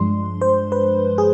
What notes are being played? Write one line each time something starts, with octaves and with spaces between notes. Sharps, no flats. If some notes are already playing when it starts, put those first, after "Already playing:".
Already playing: G2 F3 G#3 D4 C6
C5
B4
G#4